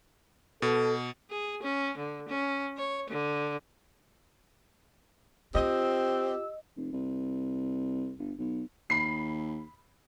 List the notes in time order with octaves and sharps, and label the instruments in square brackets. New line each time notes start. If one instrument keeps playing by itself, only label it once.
[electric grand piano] B2 [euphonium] A4
[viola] G#4
C#4
D3
C#4
C#5
D3
[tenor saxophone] C4 [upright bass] F4 [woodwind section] G4 E6 [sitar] D#5
[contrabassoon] F1
C2
G1
B1
[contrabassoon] D#2 [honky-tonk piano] B5 C7